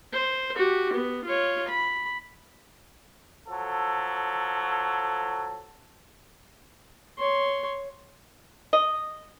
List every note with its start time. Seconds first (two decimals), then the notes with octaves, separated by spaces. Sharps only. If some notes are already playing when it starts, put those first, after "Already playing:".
0.13 C5
0.56 F#4 G4
0.94 B3
1.26 F4 C#5
1.69 B5
3.47 F3 F#3 A4
7.18 C#5 C6
8.73 D#5